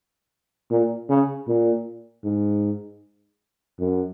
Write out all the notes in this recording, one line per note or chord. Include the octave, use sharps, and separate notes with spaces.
A#2
C#3
A#2
G#2
F#2